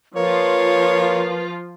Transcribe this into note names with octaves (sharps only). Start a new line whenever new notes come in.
F3 A#3 F4 B4 C#5